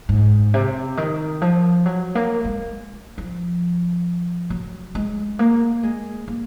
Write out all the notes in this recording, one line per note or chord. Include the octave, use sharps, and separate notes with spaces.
G#2
C3
D#3
F3
F#3
A#3
G#3
F3
F#3
G#3
A#3
G#3
A#3